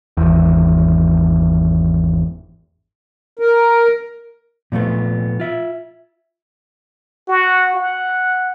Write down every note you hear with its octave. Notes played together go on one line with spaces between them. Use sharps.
G#1 E2
A#4
A#2 F3 A3 B3
F4 E5
F#4
F#5